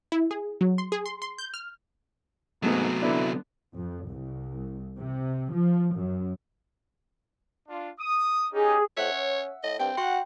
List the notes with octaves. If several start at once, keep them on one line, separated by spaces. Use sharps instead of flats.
E4
G#4
F#3
C6
G#4
C6
C6
G6
F6
G#2 C3 F#3 A3 B3
D3 B3 D4 E4
F2
C2
C3
F3
F#2
D4 F4
D#6
C#4 D#4 G4 G#4
F2 C#5 E5 F#5
C#4
A2 D#5
G2 C4 G5
F#4 F#5 C6